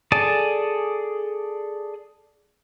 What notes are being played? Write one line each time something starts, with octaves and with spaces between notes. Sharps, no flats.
G#4 A4 D5 G#5 A5